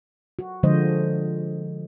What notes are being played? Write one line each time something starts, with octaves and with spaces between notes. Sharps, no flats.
F#4
D3 F3 G#3 C5 D#5